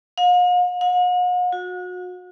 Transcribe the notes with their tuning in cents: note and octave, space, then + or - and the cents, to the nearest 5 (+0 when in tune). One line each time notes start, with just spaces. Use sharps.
F5 +45
F#5 -45
F#4 -30